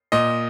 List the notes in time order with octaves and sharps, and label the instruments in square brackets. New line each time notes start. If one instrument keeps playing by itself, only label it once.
[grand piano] A#2 D#5